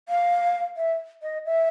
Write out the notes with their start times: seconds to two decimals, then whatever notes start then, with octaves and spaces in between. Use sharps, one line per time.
0.09 F5
0.77 E5
1.22 D#5
1.45 E5